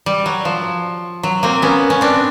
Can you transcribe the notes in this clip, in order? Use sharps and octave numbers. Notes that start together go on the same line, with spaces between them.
G3
F#3
F3
F#3
A#3 C4
B3 C#4
C#4
C4 D4